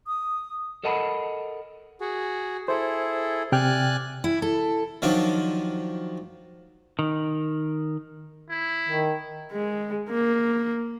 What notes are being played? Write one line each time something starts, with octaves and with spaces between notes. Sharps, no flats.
D#6
A4 A#4 D#5 F#5 A5 B5
F#4 G#4
E4 G#4 A4 C5
C3 D5 G5 G#5 F6 F#6
E4
A4
D#3 F3 F#3 D4
D#3
E4
D#3
G#3
A#3